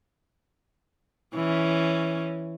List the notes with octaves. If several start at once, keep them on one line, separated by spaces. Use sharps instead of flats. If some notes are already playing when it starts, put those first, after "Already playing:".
E3 C#4